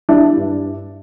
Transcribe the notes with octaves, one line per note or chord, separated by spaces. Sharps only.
G3 D4 E4
G2